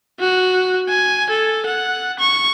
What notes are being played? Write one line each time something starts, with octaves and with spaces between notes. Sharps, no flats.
F#4
G#5
A4
F#5
C#6